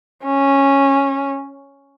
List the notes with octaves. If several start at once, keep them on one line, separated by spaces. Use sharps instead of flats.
C#4